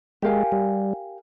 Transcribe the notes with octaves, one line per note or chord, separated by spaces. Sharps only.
G#3 G4 A#4 F5 G#5
G3